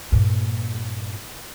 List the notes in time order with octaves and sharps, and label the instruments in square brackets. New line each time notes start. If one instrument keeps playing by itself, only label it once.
[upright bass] G2 A#2